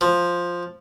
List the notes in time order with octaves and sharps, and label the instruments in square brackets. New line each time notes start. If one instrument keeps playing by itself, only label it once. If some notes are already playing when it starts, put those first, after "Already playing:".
[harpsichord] F3